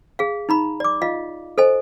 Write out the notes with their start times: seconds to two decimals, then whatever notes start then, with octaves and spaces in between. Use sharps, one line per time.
0.19 G#4 F5
0.49 D#4 A#5 B5
0.80 D5 D6
1.02 F4 D#5 F5
1.58 A4 C5 D#5 G#5